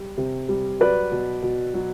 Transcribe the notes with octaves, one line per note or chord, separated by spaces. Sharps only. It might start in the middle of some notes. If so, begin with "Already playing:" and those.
Already playing: G3
C3
G3
F#3 B4 D5
B2
B2
F#3